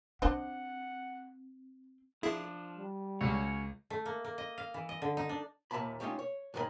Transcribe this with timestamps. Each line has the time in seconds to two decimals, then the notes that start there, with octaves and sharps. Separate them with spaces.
0.22 C4 D4 C5 D#5 F#5
2.23 F3 D4 E4 G#4 E5
2.76 G3
3.21 C#2 C#4 F#4 C#5
3.90 A3
4.05 A#3
4.25 A#3
4.38 D#5
4.58 F5
4.74 E3
4.89 D#5
5.02 D3
5.17 D#4
5.29 D4
5.71 D#2 A#2 F3 E5 A5 B5
6.00 G3 A3 C#4 D#4 F4
6.19 C#5
6.54 F2 G#2 D#3 A#4 D#5 B5